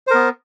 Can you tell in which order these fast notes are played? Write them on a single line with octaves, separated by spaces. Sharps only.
C5 A#4 B3